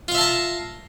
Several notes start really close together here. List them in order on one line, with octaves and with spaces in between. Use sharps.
F4 F5 E5 A5 A#5